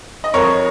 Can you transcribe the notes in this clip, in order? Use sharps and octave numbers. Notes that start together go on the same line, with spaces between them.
D#5
F2 F3 A#4 C#5